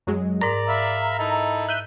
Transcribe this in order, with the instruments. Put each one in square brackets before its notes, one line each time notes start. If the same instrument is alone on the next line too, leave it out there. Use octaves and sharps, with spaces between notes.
[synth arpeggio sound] F#2 F#3 G#3
[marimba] G#2 A#4 [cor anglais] D5 [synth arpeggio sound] A#5
[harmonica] E5 F5 B5
[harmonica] D#4 E4 [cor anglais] A4
[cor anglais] E5 [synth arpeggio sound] F#6 G6 D#7